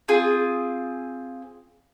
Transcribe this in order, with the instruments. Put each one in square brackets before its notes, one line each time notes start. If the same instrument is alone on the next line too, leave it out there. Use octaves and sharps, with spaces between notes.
[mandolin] C4 F4 G#4